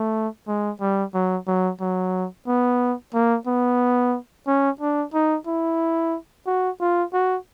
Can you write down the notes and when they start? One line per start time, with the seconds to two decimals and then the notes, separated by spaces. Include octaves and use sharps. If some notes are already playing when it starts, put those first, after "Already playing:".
Already playing: A3
0.47 G#3
0.81 G3
1.14 F#3
1.47 F#3
1.80 F#3
2.47 B3
3.14 A#3
3.47 B3
4.47 C#4
4.81 D4
5.14 D#4
5.47 E4
6.47 F#4
6.80 F4
7.14 F#4